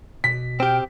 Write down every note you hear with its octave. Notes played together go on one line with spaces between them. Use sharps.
B2 B6
C4 G4 G5 F6